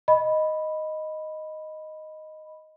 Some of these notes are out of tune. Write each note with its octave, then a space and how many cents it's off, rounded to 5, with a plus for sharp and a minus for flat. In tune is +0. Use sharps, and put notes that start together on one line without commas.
D#5 +0 B5 +0